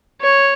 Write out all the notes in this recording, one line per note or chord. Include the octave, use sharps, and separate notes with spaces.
C#5